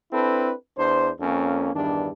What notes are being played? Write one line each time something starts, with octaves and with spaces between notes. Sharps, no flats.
C4 D4 E4 A4 B4
E2 D4 C5
F2 A#3 C#4
E2 G2 D#3 D4